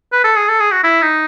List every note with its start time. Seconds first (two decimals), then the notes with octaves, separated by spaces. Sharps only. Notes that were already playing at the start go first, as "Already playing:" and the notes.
0.12 B4
0.24 A4
0.36 G#4
0.48 A4
0.60 G#4
0.72 F#4
0.84 E4
1.02 D#4